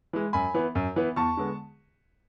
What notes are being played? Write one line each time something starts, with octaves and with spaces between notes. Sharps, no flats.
E3 G#3
F#2 G#5 B5
E3 B3
F#2
E3 B3
E2 A5 C#6
D3 G#3 B3